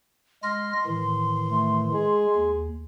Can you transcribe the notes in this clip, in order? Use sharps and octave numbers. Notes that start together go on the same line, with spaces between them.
G#3 C6 F6 A#6
A2 D#3 E3
A3
G#3 G#4
D#2